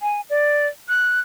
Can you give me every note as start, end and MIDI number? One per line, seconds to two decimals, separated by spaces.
0.01 0.21 80
0.30 0.67 74
0.89 1.21 90